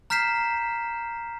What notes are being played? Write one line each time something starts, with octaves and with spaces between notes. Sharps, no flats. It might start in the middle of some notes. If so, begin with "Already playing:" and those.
A#5 F6 G6 B6 C7 E7